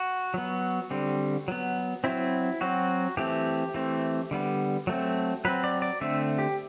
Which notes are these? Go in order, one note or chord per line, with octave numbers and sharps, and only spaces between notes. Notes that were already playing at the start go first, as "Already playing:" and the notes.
Already playing: F#4
F#3 B3
D3 G3 C4
F#3 B3
F#3 C4 E4
F#3 C4 F#4
E3 A3 C4 G4
E3 A3 C4
D3 G3 B3
F#3 A3 C4
F#3 C4 B4
D5
D5
D3 A3 C4 E5
G4